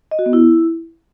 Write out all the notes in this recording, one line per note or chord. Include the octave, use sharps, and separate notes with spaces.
D#5
F#4
B3
E4